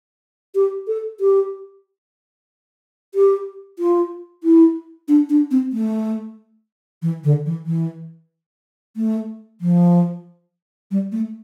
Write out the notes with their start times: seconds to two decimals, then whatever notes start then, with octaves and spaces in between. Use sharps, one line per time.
0.55 G4
0.87 A4
1.20 G4
3.15 G4
3.79 F4
4.44 E4
5.08 D4
5.29 D4
5.51 C4
5.73 A3
7.02 E3
7.24 D3
7.46 E3
7.66 E3
8.97 A3
9.61 F3
10.91 G3
11.12 A3